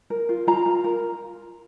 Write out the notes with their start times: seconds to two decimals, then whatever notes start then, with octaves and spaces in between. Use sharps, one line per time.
0.10 A#4
0.29 F4
0.47 F4 A#5
0.66 F4
0.84 A#4